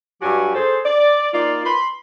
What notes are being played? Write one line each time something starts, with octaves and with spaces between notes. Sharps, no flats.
G2 F#3 F#4 G4 G#5
G#4 A4 C5
D5
A#3 D#4 F4 D5
B5 C6